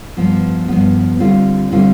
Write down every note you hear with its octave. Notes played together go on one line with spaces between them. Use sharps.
G2 F3 B3
G2 F3 B3
D3 G3 C4 F4
D3 G3 C4 F4